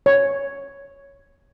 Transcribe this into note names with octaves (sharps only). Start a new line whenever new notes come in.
C#5